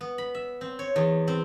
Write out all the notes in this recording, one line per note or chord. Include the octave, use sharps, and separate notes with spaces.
B3
B5
E5
C4
C#5
E2
C4